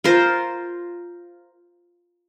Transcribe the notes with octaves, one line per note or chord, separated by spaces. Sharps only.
F4 A#4 C5